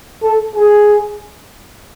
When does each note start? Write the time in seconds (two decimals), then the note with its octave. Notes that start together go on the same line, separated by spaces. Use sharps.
0.23 A4
0.55 G#4